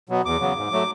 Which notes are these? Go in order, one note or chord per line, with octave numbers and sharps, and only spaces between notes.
B2 F#3 B3
E2 D6
C#3 F#3 B3
G#2
F#3 A3